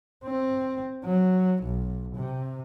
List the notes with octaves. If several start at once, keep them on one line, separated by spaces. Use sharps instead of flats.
C4
F#3
B1
C3